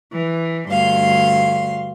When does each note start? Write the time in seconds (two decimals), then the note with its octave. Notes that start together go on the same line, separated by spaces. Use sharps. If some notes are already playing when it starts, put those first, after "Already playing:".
0.12 E3
0.69 D2 G2 F5 C6